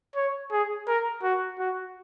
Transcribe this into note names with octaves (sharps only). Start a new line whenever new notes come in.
C#5
G#4
A#4
F#4
F#4